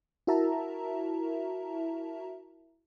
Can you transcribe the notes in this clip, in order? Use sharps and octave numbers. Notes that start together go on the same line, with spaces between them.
E4 F#4 A#4 E5 A5 A#5